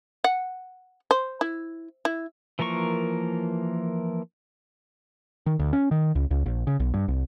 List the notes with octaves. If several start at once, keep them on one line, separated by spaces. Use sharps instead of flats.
F#5
C5
E4
E4
E3 F3 A#3 A#4 C#6
D#3
D2
C#4
D#3
C#2
C#2
A#1
C#3
B1
G2
C2